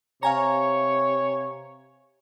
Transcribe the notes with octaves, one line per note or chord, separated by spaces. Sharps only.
C3 C#5 F5 G#5 A#5